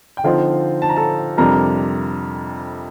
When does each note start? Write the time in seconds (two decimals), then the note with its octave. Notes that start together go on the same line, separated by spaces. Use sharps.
0.17 G5
0.24 D3 F3 C4 D#4 F4 F5
0.82 A5
0.89 A#5
0.96 A4 A5
1.38 F2 C3 G3 D4 A#4 A#5